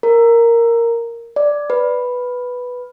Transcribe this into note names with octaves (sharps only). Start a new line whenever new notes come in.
A#4
D5
B4